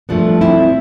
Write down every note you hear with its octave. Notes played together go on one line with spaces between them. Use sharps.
G2 F3 A3 B3 D4
C4 E4